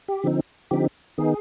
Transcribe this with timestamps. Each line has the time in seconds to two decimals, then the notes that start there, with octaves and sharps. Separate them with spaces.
0.08 G4
0.24 D3 F3 C4 D#4
0.71 D3 F3 C4 D#4 G4
1.18 D#3 B3 D#4 G#4